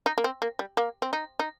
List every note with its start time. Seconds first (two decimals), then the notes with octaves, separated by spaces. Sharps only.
0.06 D#4
0.18 A#3
0.24 C4
0.42 A#3
0.59 G3
0.77 A#3
1.02 C4
1.13 D#4
1.39 D#4